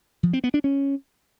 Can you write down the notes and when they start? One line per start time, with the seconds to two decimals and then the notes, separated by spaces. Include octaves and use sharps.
0.23 F3
0.33 C4
0.44 B3
0.54 D4
0.64 C#4